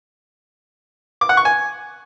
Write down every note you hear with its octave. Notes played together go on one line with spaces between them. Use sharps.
D6
F#5
C#6
G#5